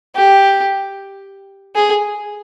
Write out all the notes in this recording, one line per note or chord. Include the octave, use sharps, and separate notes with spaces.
G4
G#4